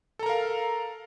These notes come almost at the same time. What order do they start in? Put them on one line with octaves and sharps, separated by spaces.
A4 A#5 A#4 F5